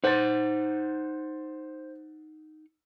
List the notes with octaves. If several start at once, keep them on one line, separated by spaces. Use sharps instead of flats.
D#4 C5 F#5 A6